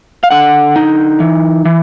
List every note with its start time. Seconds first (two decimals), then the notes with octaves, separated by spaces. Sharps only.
0.24 F5
0.31 D3 F#5
0.76 D#4
1.20 E3
1.65 E3